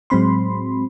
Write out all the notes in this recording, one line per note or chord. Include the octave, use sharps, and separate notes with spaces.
A2 F#3 G#3 C4 B5 C6